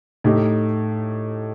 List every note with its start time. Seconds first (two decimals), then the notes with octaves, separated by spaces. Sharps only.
0.24 A2 A3 D#4 G4